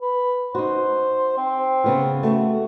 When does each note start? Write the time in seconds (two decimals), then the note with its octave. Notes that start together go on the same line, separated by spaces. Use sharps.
0.01 B4
0.55 D#4 F#4 C5
1.37 C4
1.84 C#3 B3 F4
2.23 A3 F#4